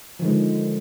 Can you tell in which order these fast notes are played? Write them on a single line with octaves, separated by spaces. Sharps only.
F3 D#3 G#3 D3